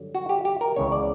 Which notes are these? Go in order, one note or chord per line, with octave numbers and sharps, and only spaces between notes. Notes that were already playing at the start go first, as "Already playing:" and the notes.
Already playing: G2 D3 F#3
F#4
G4
G4
A#4
C#2 C#3 E3 B3 C#5
D5